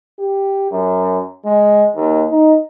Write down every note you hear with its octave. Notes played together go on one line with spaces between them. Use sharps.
G4
F#2
G#3
D#2
D#4